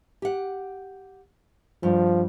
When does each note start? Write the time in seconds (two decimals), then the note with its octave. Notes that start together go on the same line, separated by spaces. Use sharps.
0.22 G4 F#5
1.83 G2 F3